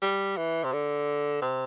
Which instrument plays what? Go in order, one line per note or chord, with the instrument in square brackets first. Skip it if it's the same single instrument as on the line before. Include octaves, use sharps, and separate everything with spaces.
[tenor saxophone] G3
E3
C3
D3
C3